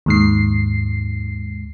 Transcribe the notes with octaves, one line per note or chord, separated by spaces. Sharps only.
D#2 G#2 C7